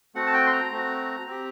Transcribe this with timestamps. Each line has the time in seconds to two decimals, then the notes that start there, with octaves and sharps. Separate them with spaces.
0.15 A3 C4 F#4 F#5
0.27 A5
0.33 G5
0.46 C6
0.53 A#5
0.71 A3 C4 F#4
1.27 C4 G4